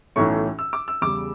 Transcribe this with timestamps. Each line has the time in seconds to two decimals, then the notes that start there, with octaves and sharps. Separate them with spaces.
0.16 B1 A2 E3 A3 C#4 C#6
0.59 E6
0.73 D6
0.88 E6
1.02 E2 C#3 G3 D6